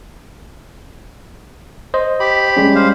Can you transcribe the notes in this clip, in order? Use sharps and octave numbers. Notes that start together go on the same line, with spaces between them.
C5 D#5
G4 B5
G3 G#3 C#4
C5 F5